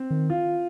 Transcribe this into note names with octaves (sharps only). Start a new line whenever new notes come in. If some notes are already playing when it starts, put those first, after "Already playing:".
Already playing: C4
D#3
F4